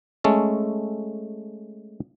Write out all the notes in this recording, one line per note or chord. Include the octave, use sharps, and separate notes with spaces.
G#3 A3 C#4 A4